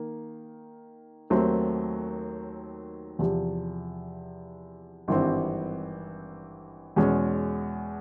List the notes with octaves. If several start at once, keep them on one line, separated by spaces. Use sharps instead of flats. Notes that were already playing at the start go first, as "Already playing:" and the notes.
Already playing: D#3 A#3
D#2 D#3 F#3 A3 C4
E2 C3 F3
G#1 G2 E3 G3 C4
E2 B2 G#3 C#4